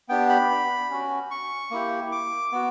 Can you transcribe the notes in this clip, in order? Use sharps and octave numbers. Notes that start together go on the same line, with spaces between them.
B3 D4 G4 G5
B5
C#4 F#4
C#6
A#3 E4 G4
D6
B3 F#4